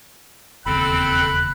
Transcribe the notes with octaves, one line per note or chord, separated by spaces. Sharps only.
E1 D#2 C#3 C4 A4 B5 F#6